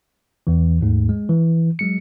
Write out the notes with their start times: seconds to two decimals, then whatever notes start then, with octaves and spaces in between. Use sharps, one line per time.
0.47 E2 E3
0.81 D#2 G#2 A3
1.09 G#3
1.29 E3
1.79 F#3 G#3 C#7